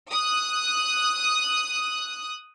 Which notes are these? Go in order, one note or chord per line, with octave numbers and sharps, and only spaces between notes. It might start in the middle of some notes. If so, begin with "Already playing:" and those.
D#6 F#6